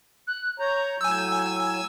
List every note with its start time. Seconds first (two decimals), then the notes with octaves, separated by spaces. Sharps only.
0.27 F#6
0.60 C#5 A#5 G6
1.01 A2 F#3 G#5 E6